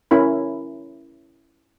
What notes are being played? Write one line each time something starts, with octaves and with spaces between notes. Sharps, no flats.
C#4 E4 A#4 B5